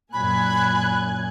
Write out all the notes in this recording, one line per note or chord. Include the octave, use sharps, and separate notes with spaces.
F#2 A#2 G#5 B5 F#6 G#6